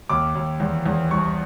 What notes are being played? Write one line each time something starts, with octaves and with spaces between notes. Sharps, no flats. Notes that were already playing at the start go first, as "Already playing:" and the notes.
D#2 D6
D#2
E2
E2
C2 C#6